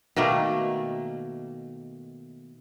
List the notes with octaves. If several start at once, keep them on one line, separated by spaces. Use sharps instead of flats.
B2 D#3 A3 A#3